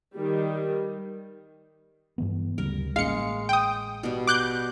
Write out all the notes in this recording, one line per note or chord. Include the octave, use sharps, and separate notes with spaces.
D#3 G3
G2 E3 B3
D2 C#3 G3 A#4
A1 G#3 A#3 C#4 F5 C#7
G5 D#6
B2 G3
D6 F#6 G6